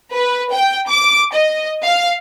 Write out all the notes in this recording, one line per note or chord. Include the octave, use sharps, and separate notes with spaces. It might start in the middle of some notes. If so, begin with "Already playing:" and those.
B4
G5
D6
D#5
F5